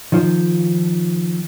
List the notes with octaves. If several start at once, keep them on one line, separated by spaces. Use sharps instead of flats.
D#3 F3